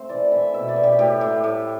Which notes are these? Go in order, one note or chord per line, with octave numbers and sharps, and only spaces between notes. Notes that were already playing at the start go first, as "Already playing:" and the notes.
Already playing: A3 C4 C5
E3 D5
E3 E5
B2 E5
D5
B2
G4
A2 G4
A2
A2